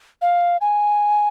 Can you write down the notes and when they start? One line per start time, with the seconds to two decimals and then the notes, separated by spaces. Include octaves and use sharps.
0.22 F5
0.61 G#5